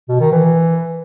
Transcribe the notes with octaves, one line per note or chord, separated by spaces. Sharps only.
B2
D#3
E3